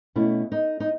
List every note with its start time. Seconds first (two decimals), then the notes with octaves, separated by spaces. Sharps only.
0.16 B2 A3 C#4 E4
0.52 D#4
0.80 D#4